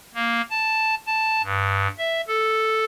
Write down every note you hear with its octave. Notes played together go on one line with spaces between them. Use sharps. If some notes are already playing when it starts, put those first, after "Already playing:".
A#3
A5
A5
G2
E5
A4